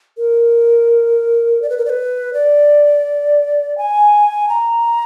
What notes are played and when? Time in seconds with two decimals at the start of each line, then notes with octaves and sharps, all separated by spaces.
0.17 A#4
1.62 D5
1.70 B4
1.78 A#4
1.85 D5
1.90 B4
2.33 D5
3.78 G#5
4.49 A#5